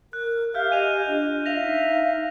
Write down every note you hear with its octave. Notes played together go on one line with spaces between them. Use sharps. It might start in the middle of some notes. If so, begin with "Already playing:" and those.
A#4 F#6
G4 E5 F5 F6 G6
D#5 G#5 G6 D#7 F7
D4 F4
E5 F5 A#6 F7
D#4